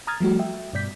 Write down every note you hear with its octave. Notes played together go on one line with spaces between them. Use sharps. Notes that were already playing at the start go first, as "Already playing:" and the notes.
A#5 D#6 F6 G#6 A6
F3 G3 A3 F#4
E5 G5
G2 B2 D5 G6 B6